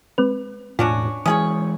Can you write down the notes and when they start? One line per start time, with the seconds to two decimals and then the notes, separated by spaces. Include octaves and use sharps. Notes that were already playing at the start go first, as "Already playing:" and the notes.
0.18 G#3 C4 B4
0.79 E1 A2 C#4 D4 F4 F#4
1.26 E3 G#3 C#4 G#4 C#5 D#6